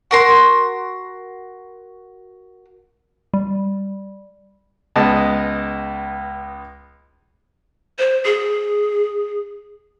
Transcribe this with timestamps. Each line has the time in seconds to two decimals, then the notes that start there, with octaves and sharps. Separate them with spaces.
0.11 F#4 A#4 C6
3.34 G3
4.96 C#2 G#3 B3 D#5 A5
7.99 C5
8.25 G#4